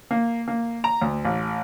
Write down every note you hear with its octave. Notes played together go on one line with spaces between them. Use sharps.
A#3
A#3
A#5
D2
A1